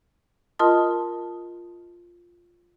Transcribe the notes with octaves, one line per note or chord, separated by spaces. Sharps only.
F4 A#4 D#5 A5 C6 D#6